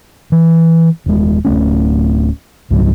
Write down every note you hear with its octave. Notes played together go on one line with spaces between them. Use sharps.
E3
D#1 G#3
D1 A3 C#4
C#2 G#2 F#3 G3